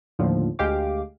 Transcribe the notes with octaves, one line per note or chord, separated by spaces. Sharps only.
D#2 A2 D3 F3
D2 G#3 G4 F5 D6